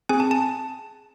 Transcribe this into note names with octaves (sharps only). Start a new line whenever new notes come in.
C4 G#4 G#5
A5
A5